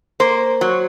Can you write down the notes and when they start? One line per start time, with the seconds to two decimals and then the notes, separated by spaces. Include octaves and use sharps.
0.20 A#3 C5
0.61 F#3